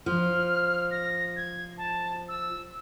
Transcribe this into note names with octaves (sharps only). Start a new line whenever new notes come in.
F3 F6
A#6
G#6
A5
E6